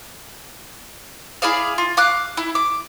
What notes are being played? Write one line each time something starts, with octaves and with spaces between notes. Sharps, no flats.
E4 G#4 D5 F5
F4
F5 D6 F#6
E4
D6